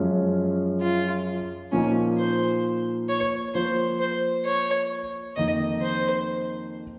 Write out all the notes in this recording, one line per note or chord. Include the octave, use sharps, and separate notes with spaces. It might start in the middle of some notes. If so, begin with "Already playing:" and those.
Already playing: F#2 F3 G#3 C#4
F4
A#2 F3 A#3 C#4 D#4
C5
C#5
F3 A#3 F4 C5
C5
C#5
F2 D#3 A#3 D#4 D#5
C5